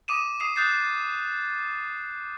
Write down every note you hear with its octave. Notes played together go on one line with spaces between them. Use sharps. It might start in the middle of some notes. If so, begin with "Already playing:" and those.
D6 D#6 D#7 E7
D#6 C7 D#7
D#6 F#6 G6 A6 C7